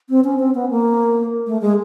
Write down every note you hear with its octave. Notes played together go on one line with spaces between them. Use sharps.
C4
C#4
C4
B3
A#3
A3
G#3